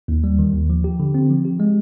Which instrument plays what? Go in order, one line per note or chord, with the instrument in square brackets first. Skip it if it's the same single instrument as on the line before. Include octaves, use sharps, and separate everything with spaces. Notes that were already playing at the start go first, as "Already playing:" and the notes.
[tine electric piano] D#2
G3
D#3
D#2
F3
G4
D3
C4
F3
G4
G#3